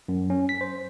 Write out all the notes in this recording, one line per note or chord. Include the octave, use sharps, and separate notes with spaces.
F#2
C#4
B6
C5